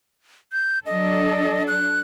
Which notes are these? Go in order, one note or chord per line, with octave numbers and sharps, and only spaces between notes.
G6
F#3 D4 A4 D#5
F#6